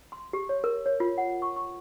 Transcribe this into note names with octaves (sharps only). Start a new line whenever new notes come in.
C6
G4
C#5
A#4
C#5
F4
F#5
C#6
C#6